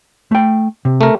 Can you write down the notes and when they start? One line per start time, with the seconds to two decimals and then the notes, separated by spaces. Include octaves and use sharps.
0.31 A3 G5
0.85 C3
1.01 A3 A#4